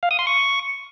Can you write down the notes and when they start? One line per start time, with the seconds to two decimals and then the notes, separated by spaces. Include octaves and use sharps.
0.03 F5
0.11 D#6
0.19 C6
0.27 C#6